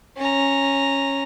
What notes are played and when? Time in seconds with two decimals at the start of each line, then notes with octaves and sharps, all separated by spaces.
0.17 C#4 A#5